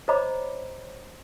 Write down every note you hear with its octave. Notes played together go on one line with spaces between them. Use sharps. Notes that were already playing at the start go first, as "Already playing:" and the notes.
C5 C#5 D#5 A#5 B5 D6